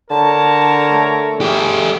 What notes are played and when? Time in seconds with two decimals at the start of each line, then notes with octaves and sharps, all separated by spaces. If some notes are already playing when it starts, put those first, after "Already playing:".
0.11 D3 A#4 C#5 A5 A#5
0.92 A3
1.41 A3 G4 G#4